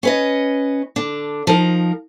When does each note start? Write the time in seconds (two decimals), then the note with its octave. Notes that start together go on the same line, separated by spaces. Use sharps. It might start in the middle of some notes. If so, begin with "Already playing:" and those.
0.03 C#4 B4 D#5
0.96 D3 D4
1.47 F3 D#4 A#4